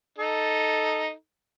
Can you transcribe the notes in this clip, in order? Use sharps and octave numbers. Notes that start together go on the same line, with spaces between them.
D#4 A4